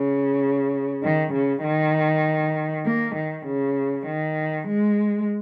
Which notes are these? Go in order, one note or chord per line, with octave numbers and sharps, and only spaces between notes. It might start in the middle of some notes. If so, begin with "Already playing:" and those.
Already playing: C#3
D#3
C#3
D#3
A#3
D#3
C#3
D#3
G#3